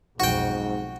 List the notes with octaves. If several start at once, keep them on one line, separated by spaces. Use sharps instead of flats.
B1 F2 G#2 F3 F#4 G5